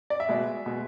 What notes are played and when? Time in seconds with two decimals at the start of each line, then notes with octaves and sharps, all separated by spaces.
0.10 D5
0.20 E5
0.29 B2 G#3
0.66 B2 G#3